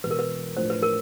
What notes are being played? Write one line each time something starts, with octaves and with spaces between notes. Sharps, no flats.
E1 E2 B2 B4
A#4
B4
A2 F3 A3 D4 F4 C5
B4
A#4